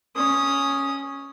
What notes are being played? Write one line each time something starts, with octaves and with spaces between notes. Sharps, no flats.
C#4 D#6